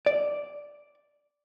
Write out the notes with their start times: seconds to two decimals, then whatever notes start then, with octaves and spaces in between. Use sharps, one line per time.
0.06 D5